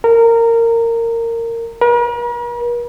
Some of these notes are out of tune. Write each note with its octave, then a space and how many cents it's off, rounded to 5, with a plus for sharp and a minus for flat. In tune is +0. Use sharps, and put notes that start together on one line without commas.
A#4 -20
A#4 +45